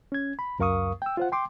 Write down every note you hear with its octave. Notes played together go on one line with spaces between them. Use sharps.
C#4 G#6
B5
C#2 F#2 A#4 F5 C#6 D#6
G5 E6
F4 C5 F#5
G5 C6 D6